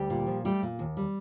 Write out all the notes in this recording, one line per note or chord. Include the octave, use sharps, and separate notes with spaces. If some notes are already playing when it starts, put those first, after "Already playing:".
Already playing: D2 G3 G4
A#2
F3
G3 A3 G4
A#2
D#2
G3